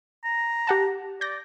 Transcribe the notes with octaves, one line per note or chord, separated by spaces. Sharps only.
A#5
G4 F#5 A5
D5 G6 A#6